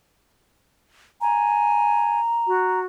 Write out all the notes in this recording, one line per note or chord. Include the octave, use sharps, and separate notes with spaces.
G#5 A#5
F#4